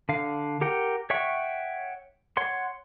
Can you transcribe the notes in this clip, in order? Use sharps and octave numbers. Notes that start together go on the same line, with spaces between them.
D3 F5
G4 A#4 F#5 G5
C#5 E5 F#5 G5 C#6
C#5 F#5 C6